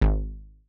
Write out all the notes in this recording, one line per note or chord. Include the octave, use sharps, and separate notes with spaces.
G#1